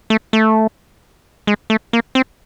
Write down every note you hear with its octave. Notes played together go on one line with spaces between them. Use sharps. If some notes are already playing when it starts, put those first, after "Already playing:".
A3
A3
G#3
A3
A#3
C4